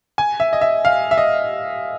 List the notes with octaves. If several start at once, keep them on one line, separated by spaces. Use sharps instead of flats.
G#5
E5
D#5
E5
F5
E5
D#5